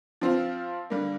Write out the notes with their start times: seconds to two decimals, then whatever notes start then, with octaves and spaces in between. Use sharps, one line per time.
0.21 F3 C4 F4
0.90 D3 G3 A#3